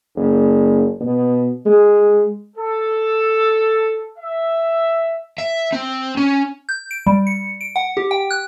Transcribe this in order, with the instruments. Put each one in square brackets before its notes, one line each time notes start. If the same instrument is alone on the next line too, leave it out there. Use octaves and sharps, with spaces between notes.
[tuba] F#1
B2
G#3
[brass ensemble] A4
E5
[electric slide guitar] E5
C4
C#4
[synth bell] G6
D7
G3
C#7
D7
F#5
G4
G5
F#6